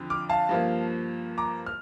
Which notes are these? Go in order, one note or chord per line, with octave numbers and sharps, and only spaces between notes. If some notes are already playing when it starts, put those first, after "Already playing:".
Already playing: F2 D3 F3
D6 F6
F5 A5
G2 F3 A#3
A#5 D6
F6